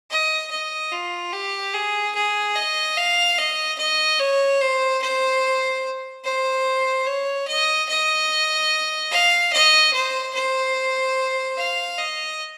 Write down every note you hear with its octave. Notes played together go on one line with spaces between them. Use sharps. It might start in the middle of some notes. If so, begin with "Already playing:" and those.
D#5
D#5
F4
G4
G#4
G#4
D#5
F5
D#5
D#5
C#5
C5
C5
C5
C#5
D#5
D#5
F5
D#5
C5
C5
F5
D#5